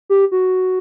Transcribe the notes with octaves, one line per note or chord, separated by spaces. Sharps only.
G4
F#4